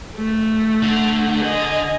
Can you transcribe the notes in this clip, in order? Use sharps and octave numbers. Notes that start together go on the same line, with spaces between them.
A3
D3
D#5 G#5